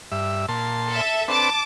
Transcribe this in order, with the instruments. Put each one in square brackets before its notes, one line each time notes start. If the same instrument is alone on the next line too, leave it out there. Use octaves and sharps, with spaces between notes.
[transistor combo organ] G2 E5
A#2 A5 C6
[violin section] A4 E5
[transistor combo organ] C4 D4 B4 [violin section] A5 D6